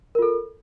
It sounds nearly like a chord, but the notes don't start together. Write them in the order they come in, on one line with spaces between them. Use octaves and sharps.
A#4 F4 A4